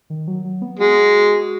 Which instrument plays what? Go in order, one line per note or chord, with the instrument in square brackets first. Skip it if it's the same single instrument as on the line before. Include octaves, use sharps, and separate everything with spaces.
[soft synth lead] D#3
F#3
F#3
B3
[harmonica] G#3 [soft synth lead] F#4